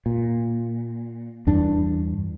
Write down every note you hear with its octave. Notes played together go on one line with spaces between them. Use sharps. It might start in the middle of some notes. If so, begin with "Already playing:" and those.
A#2
E2 G2 D4